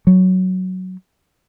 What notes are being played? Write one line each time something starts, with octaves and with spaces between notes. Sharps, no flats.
F#3